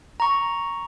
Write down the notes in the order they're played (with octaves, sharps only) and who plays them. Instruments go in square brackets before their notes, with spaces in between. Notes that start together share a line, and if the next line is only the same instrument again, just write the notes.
[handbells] A#5 C#6